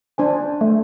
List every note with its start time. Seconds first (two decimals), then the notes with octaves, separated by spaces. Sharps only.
0.18 D4 C5 G#5
0.61 A3